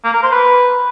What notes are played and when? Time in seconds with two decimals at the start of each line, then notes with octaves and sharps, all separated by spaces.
0.04 A#3
0.13 A#4
0.23 C5
0.32 B4